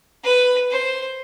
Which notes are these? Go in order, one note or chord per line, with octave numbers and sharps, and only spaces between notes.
B4
C5